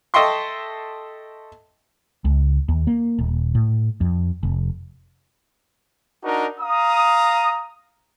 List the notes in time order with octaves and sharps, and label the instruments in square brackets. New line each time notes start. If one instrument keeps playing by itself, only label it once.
[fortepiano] A4 D#5 E5 G5 C6 C#6
[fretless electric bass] C#2
D#2
A#3
D#1
A2
F2
F1
[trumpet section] D4 D#4 F#4 A#4
F5 A#5 D#6